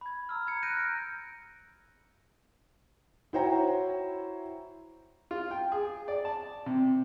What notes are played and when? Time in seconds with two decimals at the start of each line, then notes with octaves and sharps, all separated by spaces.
0.01 B5 G#6
0.29 A#5 E6 F6
0.47 A#5 G#6 C#7
0.63 F#6 G6 A#6 D7 D#7
0.75 F6 A#6 D7
3.33 E4 F#4 C5 C#5 G5 A#5
5.31 F4
5.51 G5
5.72 G#4
6.08 D5
6.25 A5
6.66 C3